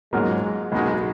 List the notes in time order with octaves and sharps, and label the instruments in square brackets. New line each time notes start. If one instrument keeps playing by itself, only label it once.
[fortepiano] G#2 F#3 A#3 F4 A#4 [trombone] G#3
[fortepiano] B1 B2 A#3 D#4 F#4 [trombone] G#3